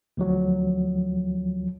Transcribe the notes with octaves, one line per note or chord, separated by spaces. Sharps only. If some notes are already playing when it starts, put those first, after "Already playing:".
D2 F3 F#3